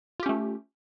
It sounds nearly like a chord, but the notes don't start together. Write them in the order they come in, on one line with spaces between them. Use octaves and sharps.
F4 G4 C#4 A3